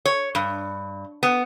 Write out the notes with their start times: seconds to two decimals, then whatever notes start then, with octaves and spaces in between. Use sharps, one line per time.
0.06 C#5
0.35 G2
1.23 B3